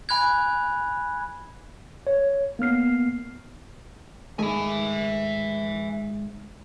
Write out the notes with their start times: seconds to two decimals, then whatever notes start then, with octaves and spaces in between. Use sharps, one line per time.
0.09 G#5 B5 F#6 G#6
2.07 C#5
2.59 A#3 B3 F6 C7
4.39 G#2 D#3 A3 E5 G#5